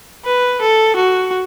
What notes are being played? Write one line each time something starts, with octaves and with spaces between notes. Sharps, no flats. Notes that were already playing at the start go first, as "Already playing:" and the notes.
B4
A4
F#4